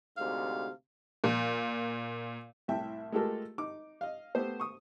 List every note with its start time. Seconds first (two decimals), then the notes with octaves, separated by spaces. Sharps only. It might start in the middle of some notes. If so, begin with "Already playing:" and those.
0.17 D2 G#2 C3 F5
1.24 A#2
2.68 C2 A2 E5 G5
3.12 G#3 A3 F4 G4 A4 A#4
3.58 D#4 D6
4.01 D#5 F5
4.35 A3 B3 G4 C5
4.60 C#6 D#6